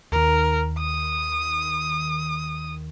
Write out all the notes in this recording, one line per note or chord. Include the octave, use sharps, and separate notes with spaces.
D#2 D#3 A#4
D#6